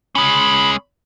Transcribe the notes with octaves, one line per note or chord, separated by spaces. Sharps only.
G#3 C#4 B5